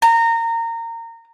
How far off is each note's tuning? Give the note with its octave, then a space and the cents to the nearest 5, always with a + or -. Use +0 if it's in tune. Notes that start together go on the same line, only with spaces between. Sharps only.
A#5 -20